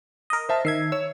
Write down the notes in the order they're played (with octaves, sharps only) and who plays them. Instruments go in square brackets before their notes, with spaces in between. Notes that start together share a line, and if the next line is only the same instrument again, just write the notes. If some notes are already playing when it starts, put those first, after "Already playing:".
[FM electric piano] A#4 D#5
[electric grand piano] C5 E5 A5
[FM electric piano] D#3 E5 G#6 [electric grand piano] C7
[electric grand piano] C#5 [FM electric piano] E6